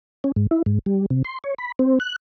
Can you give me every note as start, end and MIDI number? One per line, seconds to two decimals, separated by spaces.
0.24 0.32 61
0.36 0.47 44
0.51 0.62 64
0.66 0.79 44
0.86 1.06 55
1.10 1.22 48
1.25 1.38 84
1.44 1.54 73
1.58 1.72 83
1.79 1.99 60
2.00 2.16 90